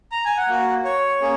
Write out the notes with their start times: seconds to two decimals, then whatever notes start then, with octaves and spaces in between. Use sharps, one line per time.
0.12 A#5
0.25 G#5
0.37 F#5
0.48 A#3 F#4
0.85 C#5
1.21 A#3 C#4 G#4